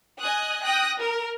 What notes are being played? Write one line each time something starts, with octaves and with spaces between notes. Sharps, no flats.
D#5 G#5 D#6 F#6
G5 D#6 F#6 A#6
A#4